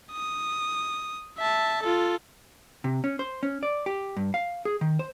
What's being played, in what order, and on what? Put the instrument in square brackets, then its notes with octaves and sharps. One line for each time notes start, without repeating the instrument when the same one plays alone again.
[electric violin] D#6
E5 A5
F4 A4
[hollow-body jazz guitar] C3
C#4
C5
C#4
D5
G4
G2
F5
G#4
D#3
C5